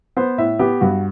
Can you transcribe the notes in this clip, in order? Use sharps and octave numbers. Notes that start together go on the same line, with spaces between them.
B3 C5
A2 E5
B3 G4
G2 F#4